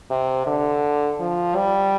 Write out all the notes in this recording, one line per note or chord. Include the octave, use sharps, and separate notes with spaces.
C3
D3
F3
G3